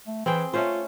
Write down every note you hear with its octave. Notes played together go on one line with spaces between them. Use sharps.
A3
E3 C4 G#4 G5
A3 C#4 F4 C5